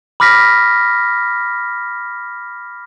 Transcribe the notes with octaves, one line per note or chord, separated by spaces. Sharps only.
B5 D6 F6 A#6 B6